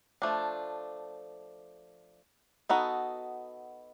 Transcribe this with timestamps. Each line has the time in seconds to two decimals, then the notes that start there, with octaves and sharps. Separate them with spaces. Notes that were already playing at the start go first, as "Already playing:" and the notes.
0.22 F3 A3 D4
2.70 B3 D#4 F#4 A4